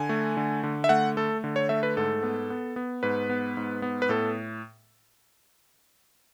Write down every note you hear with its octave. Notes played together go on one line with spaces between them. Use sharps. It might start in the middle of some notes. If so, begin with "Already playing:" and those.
Already playing: D3 G#5
A3
D3
D3
E5
A3 F#5
A3 A4
D3
C#5
A3 E5
B4
G#2 A4
B3
B3
B3
G#2 B4
B3
G#2
B3
B4
A2 A4